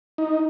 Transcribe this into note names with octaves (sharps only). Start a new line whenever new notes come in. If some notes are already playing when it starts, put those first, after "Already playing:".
D#4